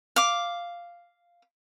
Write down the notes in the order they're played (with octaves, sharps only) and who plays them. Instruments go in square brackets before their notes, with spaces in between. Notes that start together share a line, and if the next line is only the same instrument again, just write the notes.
[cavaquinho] F5 D6